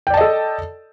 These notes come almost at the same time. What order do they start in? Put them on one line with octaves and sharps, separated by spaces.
G5 D5 A5 D#5 A4